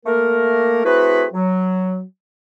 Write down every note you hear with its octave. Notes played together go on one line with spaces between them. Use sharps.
A3 A#3 A#4
A3 C4 E4 F#4 G#4 B4
F#3